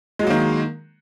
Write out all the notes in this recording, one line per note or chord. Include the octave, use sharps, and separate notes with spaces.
D#3 F#3 G#3 A#3